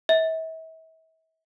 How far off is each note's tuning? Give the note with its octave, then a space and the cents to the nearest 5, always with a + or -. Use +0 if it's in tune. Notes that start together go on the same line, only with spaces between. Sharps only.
E5 -40